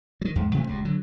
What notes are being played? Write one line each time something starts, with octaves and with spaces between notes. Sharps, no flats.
D#3 F#3
E2 G#2
B2 F3 A3 C#4
D#1 C#2 G2
D3 F#3